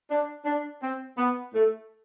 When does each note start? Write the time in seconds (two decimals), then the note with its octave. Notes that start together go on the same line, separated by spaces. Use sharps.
0.10 D4
0.45 D4
0.81 C4
1.17 B3
1.53 A3